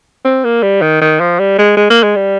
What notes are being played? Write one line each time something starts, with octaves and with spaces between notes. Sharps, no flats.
C4
A#3
G3
D#3
D#3
F3
G3
G#3
G#3
A#3
G#3
G3